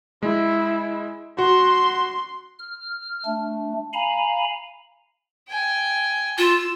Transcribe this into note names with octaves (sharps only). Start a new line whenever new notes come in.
G#3 E4
F#4 C6
F6
A3 D4
F5 G#5 A#5 B5
G5 G#5
F4 E6